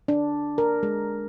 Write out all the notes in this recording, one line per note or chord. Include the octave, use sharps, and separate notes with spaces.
D4
A#4
G#3